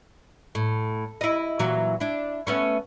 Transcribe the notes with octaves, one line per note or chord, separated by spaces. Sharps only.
A2
E4 D#5
A#2 E3 F#3
D4 E4
A3 B3 C#4